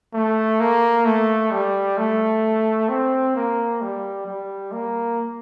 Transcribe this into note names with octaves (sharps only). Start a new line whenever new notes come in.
A3
A#3
A3
G3
A3
C4
A#3
G3
G3
A#3